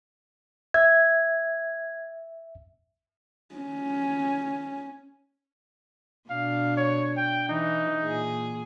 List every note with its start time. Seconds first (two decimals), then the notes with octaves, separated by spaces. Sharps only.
0.74 E5 G#6
3.55 C#4
6.30 B2 D4 F5
6.77 C#5
7.17 G5
7.49 E3 D#4
8.04 A#2 G#4